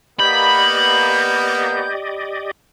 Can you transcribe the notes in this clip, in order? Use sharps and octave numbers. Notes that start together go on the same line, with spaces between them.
A#3 B3 G4 D5 D#5 B5 G6